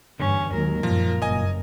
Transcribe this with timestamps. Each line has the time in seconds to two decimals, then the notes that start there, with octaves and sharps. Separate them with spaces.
0.20 E2 G2 D3 C#4
0.53 D#2 D#3 F#3 G#3 A#4
0.83 F#2 A#2 F3 F4
1.22 F#1 G2 D#5 G#5